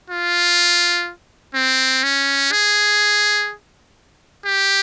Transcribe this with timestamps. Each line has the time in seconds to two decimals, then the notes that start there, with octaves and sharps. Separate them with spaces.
0.10 F4
1.55 C4
2.03 C#4
2.52 G#4
4.45 G4